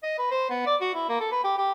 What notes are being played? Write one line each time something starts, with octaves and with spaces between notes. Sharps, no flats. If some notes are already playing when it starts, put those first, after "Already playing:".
D#5
B4
C5
B3
D5
F#4
E4
A#3
A4
B4
G4
G4